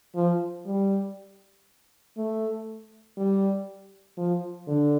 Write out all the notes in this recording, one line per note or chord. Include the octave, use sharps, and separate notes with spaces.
F3
G3
A3
G3
F3
D3